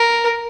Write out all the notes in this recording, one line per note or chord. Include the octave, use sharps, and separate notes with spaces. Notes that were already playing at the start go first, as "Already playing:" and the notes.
Already playing: A#4